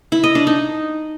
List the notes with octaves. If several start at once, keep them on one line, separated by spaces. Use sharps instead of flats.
E4
D#5
D4
D#4